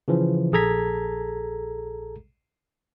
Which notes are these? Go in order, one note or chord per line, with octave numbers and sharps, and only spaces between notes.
C#3 E3 F3
A#1 G#4 A4 A#5 G#6 B6